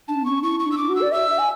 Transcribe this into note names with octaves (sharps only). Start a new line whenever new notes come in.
D4 A5
C#4
B3
C#4 C#6
E4 C#6
C#6
D4
E6
D6
F#4
E6
D5
E5 E6
E5
G#5